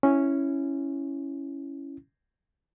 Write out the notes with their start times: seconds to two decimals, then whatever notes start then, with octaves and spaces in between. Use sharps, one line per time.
0.03 C#4 E4